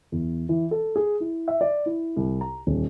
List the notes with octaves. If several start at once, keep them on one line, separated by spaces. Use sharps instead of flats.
E2
E3
A4
G#4
E4
E5
D5
E4
C2
A#5
D#1